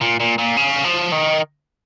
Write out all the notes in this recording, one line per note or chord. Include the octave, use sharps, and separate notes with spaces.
A#2
A#2
A#2
C#3
F3
D#3